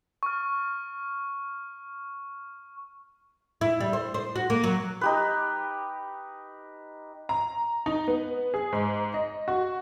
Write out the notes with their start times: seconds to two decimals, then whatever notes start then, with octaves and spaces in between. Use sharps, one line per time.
0.23 C#6 F6
3.61 E4
3.80 G3
3.93 C5
4.14 C5
4.36 F#4
4.50 A#3
4.64 F#3
5.01 D#4 G4 B4
7.29 A#5
7.86 D#4
8.08 B3
8.54 G#4
8.73 G#2
9.14 D#5
9.48 F#4